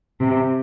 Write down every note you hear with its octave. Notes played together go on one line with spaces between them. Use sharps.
C3